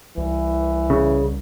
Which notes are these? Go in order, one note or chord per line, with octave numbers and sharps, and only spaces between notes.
C2 E3
C#3